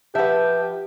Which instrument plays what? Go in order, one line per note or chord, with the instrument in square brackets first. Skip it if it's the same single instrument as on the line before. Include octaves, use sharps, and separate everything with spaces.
[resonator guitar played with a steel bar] F3 F#5 [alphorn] G4 [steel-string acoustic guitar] B4 E5 [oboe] G5